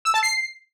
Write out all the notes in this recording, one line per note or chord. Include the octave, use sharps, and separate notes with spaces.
E6
A5
C7